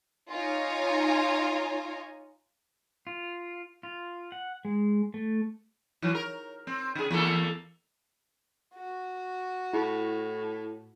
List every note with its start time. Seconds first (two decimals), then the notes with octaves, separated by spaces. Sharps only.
0.30 D#4 F4 C#5 G#5 A#5
3.07 F4
3.83 F4
4.32 F#5
4.65 G#3
5.14 A3
6.02 E3 F#3
6.15 A#4
6.67 C4
6.95 C#3 G#4
7.11 E2 A#3 A4
8.75 F#4
9.73 A2 E4